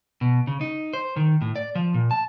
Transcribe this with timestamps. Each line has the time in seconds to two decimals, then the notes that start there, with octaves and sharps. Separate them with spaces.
0.21 B2
0.47 C#3
0.61 D#4
0.93 C5
1.16 D#3
1.41 A2
1.56 D5
1.75 F3
1.94 A#2
2.11 A5